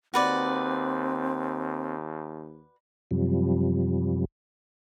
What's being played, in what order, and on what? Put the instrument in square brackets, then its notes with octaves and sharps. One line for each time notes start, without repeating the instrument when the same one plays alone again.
[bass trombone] D#2 [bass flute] C4 [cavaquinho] F#4 B4 D5
[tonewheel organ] F#2 C3 F3 G3